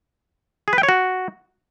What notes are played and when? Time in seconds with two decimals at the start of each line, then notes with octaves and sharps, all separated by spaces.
0.68 G#4
0.73 B4
0.78 G5
0.83 C#5
0.89 F#4